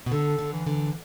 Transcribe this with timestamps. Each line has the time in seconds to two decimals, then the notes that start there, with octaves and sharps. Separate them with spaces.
0.06 B2
0.12 D3 A4
0.39 D3
0.52 E3
0.67 D3